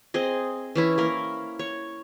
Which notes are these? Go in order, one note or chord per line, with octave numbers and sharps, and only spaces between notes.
C4 G#4 D#5
E3 C#4 E4
A#3 A#4
C#5